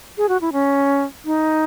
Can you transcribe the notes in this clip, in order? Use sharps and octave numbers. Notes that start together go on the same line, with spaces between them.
G#4
F#4
E4
C#4
D#4